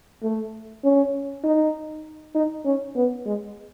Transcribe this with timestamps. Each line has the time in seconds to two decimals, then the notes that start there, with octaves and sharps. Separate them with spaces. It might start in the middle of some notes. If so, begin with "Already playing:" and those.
0.22 A3
0.84 C#4
1.44 D#4
2.35 D#4
2.65 C#4
2.96 B3
3.26 G#3